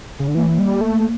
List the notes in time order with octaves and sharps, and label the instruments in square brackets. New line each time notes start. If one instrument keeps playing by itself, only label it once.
[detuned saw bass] C#3
D3
[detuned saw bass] E3 [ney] A#3
[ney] A3
A#3
[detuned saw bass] G3
A3